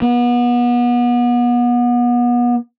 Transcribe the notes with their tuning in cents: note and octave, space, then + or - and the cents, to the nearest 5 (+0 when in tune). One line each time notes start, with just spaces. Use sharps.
B3 -30